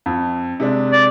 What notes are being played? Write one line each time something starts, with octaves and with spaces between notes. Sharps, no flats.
F2
C3 G#3 D4
D5